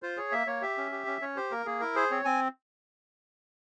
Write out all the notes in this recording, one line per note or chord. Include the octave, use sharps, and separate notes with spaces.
F4 C5
G#4 C#5
A#3 E5
A#3 C#5
G4 E5
C#4
G4
C#4
C#4 C#5
G4 C5
A#3 A#4
A#3 G#4
E4 A#4
G#4 C5
C4 C#5
C4 G#5